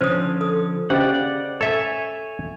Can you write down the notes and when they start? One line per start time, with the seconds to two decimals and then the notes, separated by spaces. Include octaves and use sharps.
0.01 D3 F3 C#4 C5 C#5 D#6
0.41 A4 D#6
0.90 C#3 G4 C5 D5 D#5 F#5
1.61 A4 C#5 E5 G#5